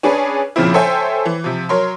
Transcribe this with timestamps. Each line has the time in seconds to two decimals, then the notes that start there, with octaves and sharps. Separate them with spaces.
0.03 C#4 D4 G#4 B4
0.56 F2 A#2 C#3 F3 C4 E4
0.74 A4 C5 C#5 E5 G5 G#5
1.25 E3
1.44 C3 F3
1.69 F#3 A#4 C#5 C6